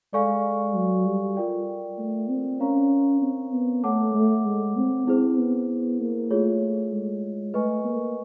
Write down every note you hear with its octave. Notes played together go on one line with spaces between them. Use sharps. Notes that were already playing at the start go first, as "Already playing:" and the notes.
G#3 A4 D5 F5 G#5 C#6
F#3
G3
F4 A#4 D5 G5
A3
C4
C#4 A#4 C#5 F5 A#5 C#6
C4
B3
A3 A4 C#5 F#5 A5 D6
A3
G#3
C4
C4 E4 G#4 C5
B3
A#3
A3 F4 G#4 C#5
G#3
A3 B4 D#5 G#5 C#6
A#3